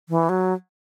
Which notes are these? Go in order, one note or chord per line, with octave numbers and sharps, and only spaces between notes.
E3
F#3